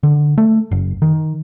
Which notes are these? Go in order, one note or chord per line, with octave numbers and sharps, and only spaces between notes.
D3
A3
F#1
D#3